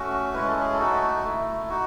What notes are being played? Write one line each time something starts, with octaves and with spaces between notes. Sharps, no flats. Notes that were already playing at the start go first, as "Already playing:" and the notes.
Already playing: A3 C#4 F#4
G#3 C#4 E4 B4
A4
G#4
A4
A3 D#4 F#4
A3 E4
D#4 F#4